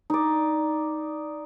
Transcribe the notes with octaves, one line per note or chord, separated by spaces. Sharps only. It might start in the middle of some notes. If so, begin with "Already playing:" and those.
D#4 D5